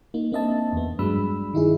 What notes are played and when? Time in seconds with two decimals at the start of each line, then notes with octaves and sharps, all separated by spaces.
0.14 A#3 D#4
0.32 A#3 C4 D4 D#5 E5 A5
0.73 E2 B3
0.99 G2 F#3 G#3 D4 B5 E6
1.54 D#3 D#4 E4 G#4